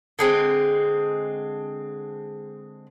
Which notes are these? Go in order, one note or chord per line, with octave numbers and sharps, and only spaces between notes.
D3 G#3 C4